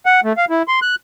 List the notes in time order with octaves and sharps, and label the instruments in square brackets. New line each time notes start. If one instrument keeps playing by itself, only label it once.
[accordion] F#5
A3
F5
E4
C6
F#6